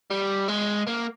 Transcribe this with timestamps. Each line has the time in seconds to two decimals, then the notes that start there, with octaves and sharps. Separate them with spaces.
0.10 G3
0.48 G#3
0.87 A#3